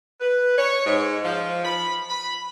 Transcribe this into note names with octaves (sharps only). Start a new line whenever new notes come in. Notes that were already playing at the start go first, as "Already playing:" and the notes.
B4
C#5
G#2
F3
B5
B5